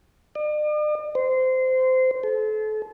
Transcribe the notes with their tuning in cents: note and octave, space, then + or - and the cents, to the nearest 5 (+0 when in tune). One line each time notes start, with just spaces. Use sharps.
D5 +45
C5 -20
A4 -35